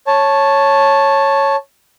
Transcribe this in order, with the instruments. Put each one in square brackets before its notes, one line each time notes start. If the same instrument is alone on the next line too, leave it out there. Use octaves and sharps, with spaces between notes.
[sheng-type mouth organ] C#5 A5